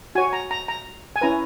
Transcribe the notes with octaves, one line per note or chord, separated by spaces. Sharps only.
F#4 C#5 G#5
A#5
A#5
A#5
G#5
C#4 E4 B4 A#5